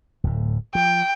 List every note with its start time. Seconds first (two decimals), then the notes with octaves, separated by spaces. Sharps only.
0.24 D1 A2
0.75 F3 G5